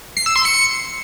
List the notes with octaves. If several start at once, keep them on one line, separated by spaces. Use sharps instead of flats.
C7
E6
C6
C#7